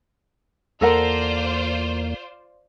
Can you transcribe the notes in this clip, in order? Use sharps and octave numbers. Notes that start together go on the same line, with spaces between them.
E2 A#3 F4 A4 A#4 C5 D5 F#5